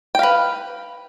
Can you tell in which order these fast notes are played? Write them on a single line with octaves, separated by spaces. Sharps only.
G5 F5 B4